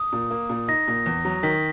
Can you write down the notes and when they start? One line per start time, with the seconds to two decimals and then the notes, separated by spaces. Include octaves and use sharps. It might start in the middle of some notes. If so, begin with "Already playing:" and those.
Already playing: D#6
0.12 A#2
0.30 A#3
0.49 A#2
0.68 D#4 A#6
0.87 A#2
1.06 E2
1.25 F#3
1.43 D#3 B6